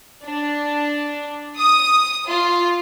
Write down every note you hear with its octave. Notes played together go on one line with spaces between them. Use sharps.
D4
D#6
F4